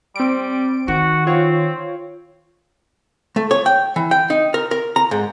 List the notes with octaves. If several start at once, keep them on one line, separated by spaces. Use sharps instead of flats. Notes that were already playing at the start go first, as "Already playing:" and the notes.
G3 C4 D7
D#3 F#4
C4 F4 C#5
A3
C#5
G5
E3
G5
D#4
A#4
A#4
A#5
G#2